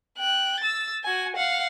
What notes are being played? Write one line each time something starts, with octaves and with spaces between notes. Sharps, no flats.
G5 F#6
E6 A6
F#4 G#5
F5 F#5